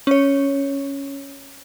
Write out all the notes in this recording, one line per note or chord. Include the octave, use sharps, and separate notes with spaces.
C#4 C#5